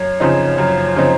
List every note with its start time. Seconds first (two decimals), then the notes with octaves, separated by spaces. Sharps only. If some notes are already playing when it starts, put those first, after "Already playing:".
Already playing: F#2 C#5
0.20 C#3 F3 C4 D#4
0.58 F#2
0.96 C#3 F3 C4 D#4